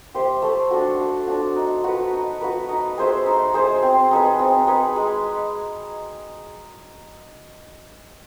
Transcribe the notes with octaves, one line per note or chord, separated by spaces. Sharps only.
G4 C5 E5
A3
D4 F#4
A3
D4 F#4
D#4
F#4 B4
D#4
F#4 B4
D#4
G#4 C5 E5
D#4
G#4 C5 E5
C4
D#4 G#4 B4
C4
D#4 G#4 B4
G#3